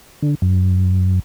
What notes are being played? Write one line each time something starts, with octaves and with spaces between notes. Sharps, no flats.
D3
F#2